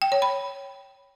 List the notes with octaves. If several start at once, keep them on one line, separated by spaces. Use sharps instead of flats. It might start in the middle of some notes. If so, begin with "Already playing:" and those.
G5
C#5
B5